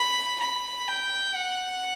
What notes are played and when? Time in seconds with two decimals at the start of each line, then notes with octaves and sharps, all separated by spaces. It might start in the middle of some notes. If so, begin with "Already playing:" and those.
Already playing: B5
0.39 B5
0.88 G5
1.36 F#5